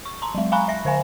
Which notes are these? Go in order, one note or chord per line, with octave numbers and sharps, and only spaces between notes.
C#6
A5 A#5 C6
F#3 G#3
F5 G#5 A#5 B5 C#6 F#6
E5 A#6
D3 C5 F5 G#5